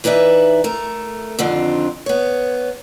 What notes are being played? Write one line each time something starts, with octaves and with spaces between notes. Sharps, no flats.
E3 D#4 B4 D5 E5
A3 A#4
F2 D3 D#3 C4 D4 F4
B3 C#5